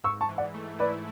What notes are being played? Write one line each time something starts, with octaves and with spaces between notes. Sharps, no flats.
G#2 C#6 E6
A5 C#6
E3
D5 F#5
A3
E4 B4 D5